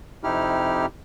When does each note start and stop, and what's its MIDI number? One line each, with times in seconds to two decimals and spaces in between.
0.24 0.86 41
0.24 0.86 48
0.24 0.86 63
0.24 0.86 64
0.24 0.86 67
0.24 0.86 89